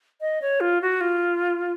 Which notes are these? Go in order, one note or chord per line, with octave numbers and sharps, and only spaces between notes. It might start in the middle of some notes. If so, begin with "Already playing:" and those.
D#5
C#5
F4
F#4
F4